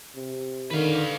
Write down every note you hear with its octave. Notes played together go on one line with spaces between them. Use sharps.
C3
D3 D#3 B4 F5